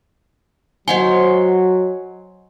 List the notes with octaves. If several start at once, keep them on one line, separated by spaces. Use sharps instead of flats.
F#3 C5 C#5 D#5 F#5 G#5 C6